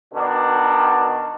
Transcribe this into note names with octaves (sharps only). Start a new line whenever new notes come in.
B2 D#3 D4